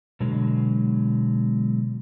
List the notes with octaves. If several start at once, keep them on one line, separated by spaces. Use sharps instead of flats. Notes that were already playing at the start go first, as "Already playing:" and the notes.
B2 D3 F#3 G#3